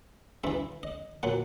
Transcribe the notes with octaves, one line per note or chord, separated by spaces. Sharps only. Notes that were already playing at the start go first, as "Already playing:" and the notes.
G2 E3 E5
D#5
A#2 F#3 F#5